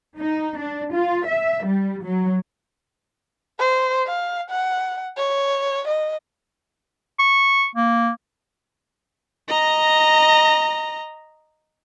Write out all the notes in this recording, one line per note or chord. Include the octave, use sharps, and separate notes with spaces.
D#4
D4
F4
E5
G3
F#3
C5
F5
F#5
C#5
D#5
C#6
A#3
D#5 A#5